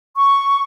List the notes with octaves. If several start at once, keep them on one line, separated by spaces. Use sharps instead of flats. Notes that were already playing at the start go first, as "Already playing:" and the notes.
C#6